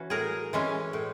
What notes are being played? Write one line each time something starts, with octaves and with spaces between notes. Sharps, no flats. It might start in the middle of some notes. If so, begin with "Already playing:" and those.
Already playing: E3 C#4 F#4
A2 G#4 A#4
E3 G#3 C#4
A2